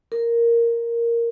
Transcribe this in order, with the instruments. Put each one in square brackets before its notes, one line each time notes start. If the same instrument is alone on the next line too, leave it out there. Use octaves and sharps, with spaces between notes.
[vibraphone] A#4